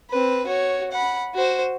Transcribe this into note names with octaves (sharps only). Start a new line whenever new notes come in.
C4 B4
F#4 C#5
F#5 B5
F#4 C5